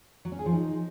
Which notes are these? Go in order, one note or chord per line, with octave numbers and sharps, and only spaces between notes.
F#3
C#4
G#4
F3
D#4